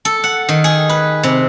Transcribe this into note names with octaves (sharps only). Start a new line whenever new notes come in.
A4
F#5
D#3
G#4
B4
C3